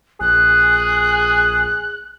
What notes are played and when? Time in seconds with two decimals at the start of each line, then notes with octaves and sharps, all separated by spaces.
0.21 A#1 G#4 F#6